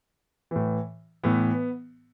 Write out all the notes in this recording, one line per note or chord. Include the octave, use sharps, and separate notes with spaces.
A2 E3
A2 E3 B3